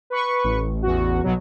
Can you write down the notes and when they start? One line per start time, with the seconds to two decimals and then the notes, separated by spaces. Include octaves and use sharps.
0.10 B4 C#6
0.44 A1
0.83 E2 F#4
1.24 B1 B2 F#3